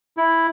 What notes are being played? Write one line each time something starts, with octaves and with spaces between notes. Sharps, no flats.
E4